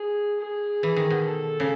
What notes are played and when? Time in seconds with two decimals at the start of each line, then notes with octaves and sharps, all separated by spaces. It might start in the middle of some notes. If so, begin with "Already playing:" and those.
Already playing: G#4
0.40 G#4
0.83 E3
0.96 D#3
1.10 B2
1.25 A4
1.60 C#3